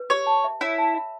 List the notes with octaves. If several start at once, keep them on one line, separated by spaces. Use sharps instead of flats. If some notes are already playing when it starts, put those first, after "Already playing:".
Already playing: B4
G4 C#5
A5
E5
E4 C#5
A5
E5